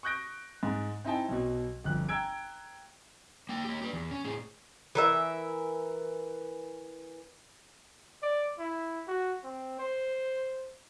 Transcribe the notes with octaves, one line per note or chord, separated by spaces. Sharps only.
C#6 D#6 F#6 G6 A#6 D7
G#2
C4 D#4 E4 D#5 G5 A5
B1 B2
G1 F2 F#6
G5 A#5 E6 G#6 D7
A#3 G5
A#3 G4
G4 B4
E2
C#4
A2 G#4
E3 A#4 E5
D5
E4
F#4
C4
C5